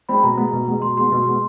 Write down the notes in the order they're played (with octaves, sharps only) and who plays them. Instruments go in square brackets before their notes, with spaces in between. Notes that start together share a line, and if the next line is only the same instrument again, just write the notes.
[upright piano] G#3 C4 [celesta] B5
[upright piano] B2 [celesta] A#5
[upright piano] G#3 B3
B2
G#3 B3
[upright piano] B2 [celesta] C6
[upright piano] G#3 B3 [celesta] C6
[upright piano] B2
G#3 B3